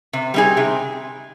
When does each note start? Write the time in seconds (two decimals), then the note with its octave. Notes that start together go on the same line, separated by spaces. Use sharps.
0.13 C3
0.34 G3 C4 D#4 G#4
0.57 C3